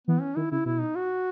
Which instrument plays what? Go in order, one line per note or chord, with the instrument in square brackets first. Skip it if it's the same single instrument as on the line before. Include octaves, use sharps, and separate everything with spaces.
[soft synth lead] E3 [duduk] B3
[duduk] C#4
[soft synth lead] D#3 [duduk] E4
[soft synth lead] C#3 [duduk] E4
[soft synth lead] B2 [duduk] E4
[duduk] D#4
F#4